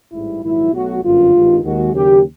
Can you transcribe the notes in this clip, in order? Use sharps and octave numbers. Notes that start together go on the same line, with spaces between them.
A1 G#2 E3 G3 E4
A#1 G#2 D#3 F#3 E4
B1 B2 F#3 A3 F#4
G1 F#2 D3 F4
G#1 G2 D#3
D#2 D#3 G#3 F#4
D#2 C#3 F#3 A#3 G4